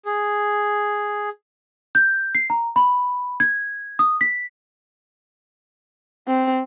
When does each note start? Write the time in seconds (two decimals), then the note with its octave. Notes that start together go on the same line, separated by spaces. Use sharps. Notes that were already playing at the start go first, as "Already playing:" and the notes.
0.06 G#4
1.95 G6
2.35 C7
2.50 A#5
2.76 B5
3.40 G#6
3.99 D#6
4.21 B6
6.28 C4